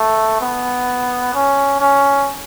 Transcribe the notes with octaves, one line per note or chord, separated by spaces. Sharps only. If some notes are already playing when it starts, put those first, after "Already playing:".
Already playing: A3
B3
C#4
C#4